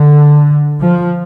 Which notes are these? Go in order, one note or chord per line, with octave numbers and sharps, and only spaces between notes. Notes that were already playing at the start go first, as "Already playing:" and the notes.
Already playing: D3
F3